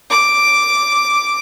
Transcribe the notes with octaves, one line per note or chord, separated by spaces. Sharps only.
D6